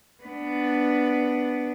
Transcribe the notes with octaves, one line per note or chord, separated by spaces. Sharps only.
B3 D4